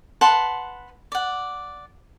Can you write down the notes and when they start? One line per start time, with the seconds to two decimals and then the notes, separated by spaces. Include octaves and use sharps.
0.21 B4 F#5 A5 C6
1.12 D5 F#5